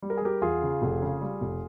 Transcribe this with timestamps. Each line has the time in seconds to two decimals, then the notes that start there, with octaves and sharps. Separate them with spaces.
0.02 G3
0.10 A#4
0.17 G#4
0.22 G3 G4 A#4
0.42 E2 F4 G#4
0.62 C#3
0.82 F1
1.02 C#3
1.21 G3
1.41 F1